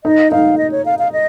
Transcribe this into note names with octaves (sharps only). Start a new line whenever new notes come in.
D#4 D#5
D#4 F5
D#5
C#5
F5
F5
D#5